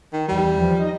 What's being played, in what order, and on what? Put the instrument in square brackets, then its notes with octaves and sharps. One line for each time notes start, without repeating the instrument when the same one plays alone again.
[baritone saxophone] D#3
[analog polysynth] E2 E3 [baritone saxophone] G3
[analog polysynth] F3
D#4 D#5 A#6